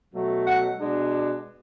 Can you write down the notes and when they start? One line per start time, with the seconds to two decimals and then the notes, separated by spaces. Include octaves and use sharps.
0.14 B2 F#3 A3
0.46 F#5
0.79 B2 G#3 D4